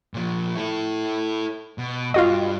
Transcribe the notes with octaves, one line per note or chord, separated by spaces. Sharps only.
A#2 F3
E4 A4
B2
G2 F4 F#4 D#5